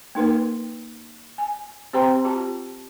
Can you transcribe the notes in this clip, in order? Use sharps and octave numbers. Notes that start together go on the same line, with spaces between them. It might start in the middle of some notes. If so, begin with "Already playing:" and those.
A#3 D#4 A#4 B4
G#5
C4 G4 C5 G5 A#5 C6
F4 G4 A5